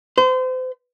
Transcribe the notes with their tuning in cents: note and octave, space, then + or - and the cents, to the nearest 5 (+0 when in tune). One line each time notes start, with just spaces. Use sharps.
C5 -35